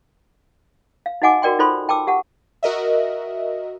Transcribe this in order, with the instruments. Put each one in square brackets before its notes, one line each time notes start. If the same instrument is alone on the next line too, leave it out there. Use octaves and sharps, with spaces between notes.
[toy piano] F5
D#4 F#4 D#5 F#5 G#5 D6
F#4 A#4 D5 G5 C6
D#4 F4 A4 C5 B5 C6
G5 A5 D6 E6
G4 F#5 A5
[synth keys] F#4 A#4 D#5 E5